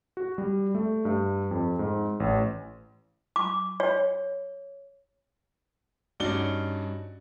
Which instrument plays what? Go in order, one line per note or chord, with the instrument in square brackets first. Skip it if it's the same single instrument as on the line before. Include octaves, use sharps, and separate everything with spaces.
[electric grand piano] F#4
G3
A3
G2
F2
G#2
A1
[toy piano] D6
C#5
[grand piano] G2 C#4 D#4 F#4 D5 G7